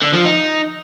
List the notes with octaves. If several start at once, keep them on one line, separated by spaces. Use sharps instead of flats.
D3
F3
D#4